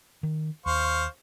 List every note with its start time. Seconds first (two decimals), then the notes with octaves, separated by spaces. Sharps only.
0.23 D#3
0.66 D#2 C5 F5 C#6